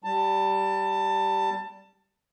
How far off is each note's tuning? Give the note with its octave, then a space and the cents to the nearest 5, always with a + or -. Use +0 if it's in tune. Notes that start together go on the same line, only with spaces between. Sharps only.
G3 -15 A5 +20